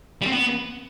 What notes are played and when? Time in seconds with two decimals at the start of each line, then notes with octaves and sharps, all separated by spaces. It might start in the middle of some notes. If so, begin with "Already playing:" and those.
0.22 G3
0.27 C4
0.32 B3